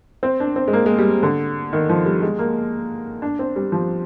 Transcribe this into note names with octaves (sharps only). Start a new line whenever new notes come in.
C4
D4
C4
G#3
A#3
G#3
G3
D3
D#3
F3
G3
G#3
A#3
D4
C4
G3
F3